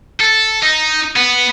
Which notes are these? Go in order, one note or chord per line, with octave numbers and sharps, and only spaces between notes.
A4
D#4
B3